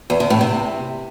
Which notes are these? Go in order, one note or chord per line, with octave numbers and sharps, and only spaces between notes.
E2
D3
A2
C3